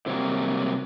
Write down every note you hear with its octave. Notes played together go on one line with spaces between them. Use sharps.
A2 C3 F#3 G3 A#3